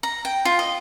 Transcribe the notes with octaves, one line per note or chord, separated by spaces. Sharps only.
A#5
G5
F4
D#5